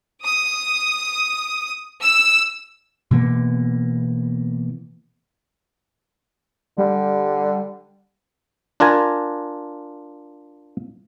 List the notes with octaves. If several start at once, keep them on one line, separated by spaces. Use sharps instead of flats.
D#6
E6
B2 E3 A#3 B3
D3 G3
D4 F4 A#4 G#5